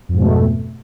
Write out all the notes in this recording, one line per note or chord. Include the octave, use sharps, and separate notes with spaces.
F2 G#2 B2 A3